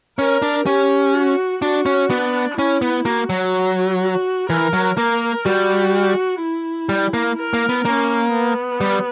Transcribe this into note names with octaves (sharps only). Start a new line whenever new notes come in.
C#4 A#4
D4
C#4 G4
F#4
D4 F#4
C#4
B3 D4
C#4 E4
B3
A#3 F#4
F#3
F#4
E3 A#4
F#3
A#3 A#4
G3 F#4
E4
G3
A#3
A#4
A#3
B3
A#3 C#4
B3
G3